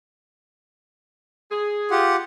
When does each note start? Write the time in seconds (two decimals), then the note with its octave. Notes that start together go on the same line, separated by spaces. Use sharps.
1.51 G#4
1.91 F4 G4 F#5